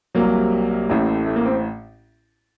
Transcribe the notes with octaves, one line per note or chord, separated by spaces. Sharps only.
C2 C3 F#3 A#3
A1 A2 A3
A3
A#3
C4